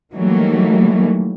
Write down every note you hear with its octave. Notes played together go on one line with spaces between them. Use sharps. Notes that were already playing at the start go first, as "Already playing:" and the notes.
D#3 E3 F#3 G3 A3 A#3